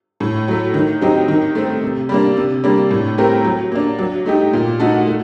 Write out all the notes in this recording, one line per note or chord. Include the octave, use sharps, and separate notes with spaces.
A2
F#3 A3
D#3
F#3 C4 D#4 G4
D#3
A3 C4
C3
G3 A#3 D4
C3
G3 A#3 D4
A2
A3 C4 G4 A#4
F#3
A#3 D4
F#3
A3 D#4 G4
A#2
A3 D#4 F#4 A4
A3